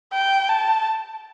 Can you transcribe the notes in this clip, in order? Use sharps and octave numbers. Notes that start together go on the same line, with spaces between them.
G5
A5